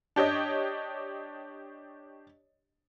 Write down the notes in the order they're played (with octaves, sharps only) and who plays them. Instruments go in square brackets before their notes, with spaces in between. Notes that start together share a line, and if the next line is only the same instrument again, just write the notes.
[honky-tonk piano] D4 G4 C#5 D#5